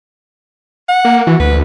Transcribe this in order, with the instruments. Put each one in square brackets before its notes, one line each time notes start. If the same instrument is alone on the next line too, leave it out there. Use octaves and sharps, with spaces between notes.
[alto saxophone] F#5
[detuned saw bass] A#3
[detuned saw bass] E3 [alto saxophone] F#4
[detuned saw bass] D2 [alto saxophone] B4